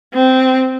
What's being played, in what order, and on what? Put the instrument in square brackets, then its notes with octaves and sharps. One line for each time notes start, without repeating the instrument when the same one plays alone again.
[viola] C4